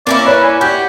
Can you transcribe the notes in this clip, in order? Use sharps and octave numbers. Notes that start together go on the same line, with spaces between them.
A#3 C4 C#4 E4 D5
B4 C#5 D5
G#5
F#4 G4